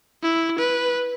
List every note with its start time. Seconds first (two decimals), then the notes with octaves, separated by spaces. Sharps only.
0.23 E4
0.58 B4